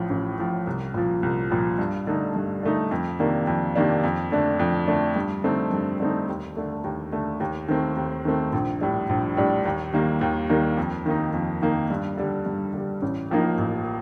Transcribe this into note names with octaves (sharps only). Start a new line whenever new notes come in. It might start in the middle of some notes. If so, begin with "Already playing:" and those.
Already playing: A1 A2 F3
A1
A2 F3
C2
A#2 F3
C2
A#2 F3
G2
D3 A3 D#4
G2
D3 A3 D#4
F2
C3 D#3 A#3 D4
F2
C3 D#3 A#3 D4
F2
D3 A3 D4
F2
D3 A3 D4
G2
D3 A3 C4 D#4
G2
D3 A3 C4 D#4
D#2
D3 A3
D#2
D3 A3
D#2
D#3 A3 C4
D#2
D#3 A3 C4
A#1
A2 G3 D4
A#1
A2 G3 D4
D#2
D#3 G3 A#3
D#2
D#3 G3 A#3
F2
D#3 A#3 D#4
F2
D#3 A#3 D#4
G2
D3 G3
G2
D3 G3
A1
A2 F3 A#3 D#4
A1